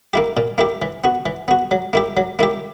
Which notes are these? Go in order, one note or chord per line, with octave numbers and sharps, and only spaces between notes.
A#3 E4 G4
A#2
A#3 E4 G4
E3
B3 F#4
E3
B3 F#4
F#3
A#3 E4 G4
F#3
A#3 E4 G4